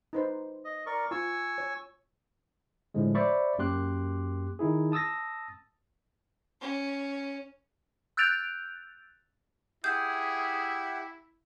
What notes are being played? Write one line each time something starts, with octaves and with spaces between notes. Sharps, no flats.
D#4 B4 C5
D#5
A#4 D5 C#6
F4 G#5 C#6 E6
C#5
A2 D3 F3 G#3
C5 D5 E5 B5 C#6
F#2 A#3 G4 C6 D6 F#6
D#3 D#4 E4 G#4
A5 D#6 E6 A6 A#6
C#4
E6 F#6 G6 A6 D7 F7
E4 G4 G#4 E5 F#5 G6